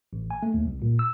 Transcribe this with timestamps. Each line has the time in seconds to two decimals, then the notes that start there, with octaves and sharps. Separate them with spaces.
0.13 A1
0.31 G#5
0.43 A3
0.54 D#2
0.65 C2
0.82 A#2
0.99 E6